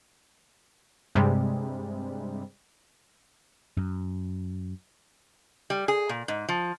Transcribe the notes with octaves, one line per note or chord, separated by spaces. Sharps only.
G2 C3 G3 G#3
F#2
G3
G#4
A#2
G#2
F3